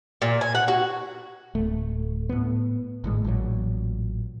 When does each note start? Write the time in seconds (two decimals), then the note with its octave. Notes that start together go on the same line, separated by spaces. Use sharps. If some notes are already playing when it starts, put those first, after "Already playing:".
0.22 A#2
0.41 G#5
0.55 F#5
0.68 F#4
1.55 D1 A3
2.29 A2 B3
3.04 G#1 A2 G#3
3.24 A1 A#2 C#3 F#3